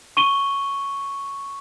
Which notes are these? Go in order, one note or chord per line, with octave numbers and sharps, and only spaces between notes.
C#6 D#7 G7